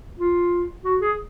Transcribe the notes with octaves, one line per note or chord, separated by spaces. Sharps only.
F4
F#4
G#4